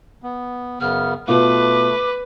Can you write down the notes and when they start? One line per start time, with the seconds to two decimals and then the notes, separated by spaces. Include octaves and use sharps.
0.23 B3
0.81 F#2 C#3 B3 F6
1.28 B2 A3 F4 B4 D6